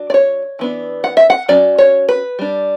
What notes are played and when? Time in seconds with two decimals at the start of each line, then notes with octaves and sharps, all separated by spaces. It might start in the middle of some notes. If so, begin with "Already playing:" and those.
Already playing: F#3 D4
0.10 D5
0.14 C#5
0.59 E3 B3 D4
1.04 F#5
1.17 E5
1.30 F#5
1.48 F#3 C#4 D5
1.78 C#5
2.09 B4
2.39 G3 D4